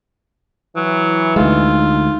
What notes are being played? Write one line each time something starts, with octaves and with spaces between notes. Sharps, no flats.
E3 F#3
D2 G#3 D#4 F4 F5